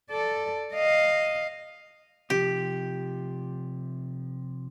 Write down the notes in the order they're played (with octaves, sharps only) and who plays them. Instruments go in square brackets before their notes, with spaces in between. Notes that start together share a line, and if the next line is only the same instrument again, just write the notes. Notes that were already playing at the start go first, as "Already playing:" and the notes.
[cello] A4 D5
D#5 F5
[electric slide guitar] C3 F3 [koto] G4